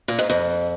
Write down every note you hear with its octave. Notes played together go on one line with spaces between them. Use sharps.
A#2
G#2
F2